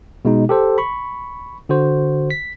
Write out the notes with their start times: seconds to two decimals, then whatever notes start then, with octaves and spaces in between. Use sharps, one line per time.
0.25 B2 G#3 D#4
0.49 G4 A4 C5
0.78 B5 C#6
1.69 D3 F#4 C5
2.31 B6